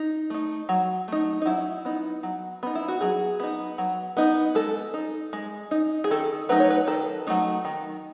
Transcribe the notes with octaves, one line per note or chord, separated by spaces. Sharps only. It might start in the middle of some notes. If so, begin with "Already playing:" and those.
Already playing: D#4
A3 D#4
F#3
A3 D#4
D#4
F#3 E4
B3 D#4
F#3
B3 D#4
E4
F#4
F#3 G#4
B3 D#4
F#3
B3 D#4
G#3 A4
D#4
G#3
D#4
G#4
D#3 A4
F#3 A3 D#4 B4
C#5
B4
D#3 A4
F#3 A3 D#4
D#3